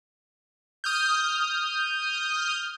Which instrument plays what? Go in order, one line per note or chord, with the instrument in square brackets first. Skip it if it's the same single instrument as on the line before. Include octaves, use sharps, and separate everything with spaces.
[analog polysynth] D#6 F6 G6